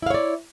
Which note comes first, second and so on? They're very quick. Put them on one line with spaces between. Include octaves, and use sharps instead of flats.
E4 F5 C#5 D5